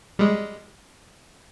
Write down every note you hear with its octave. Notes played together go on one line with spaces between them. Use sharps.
G3 G#3